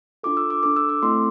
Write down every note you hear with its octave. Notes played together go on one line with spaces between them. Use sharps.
D4 F4 A4 D6
E6
D6
D4 A4 D6
E6
D6
A3 C4 E4 A4 C6